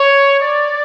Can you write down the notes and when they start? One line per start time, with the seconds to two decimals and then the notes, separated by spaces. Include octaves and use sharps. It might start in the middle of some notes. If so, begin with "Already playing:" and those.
Already playing: C#5
0.40 D5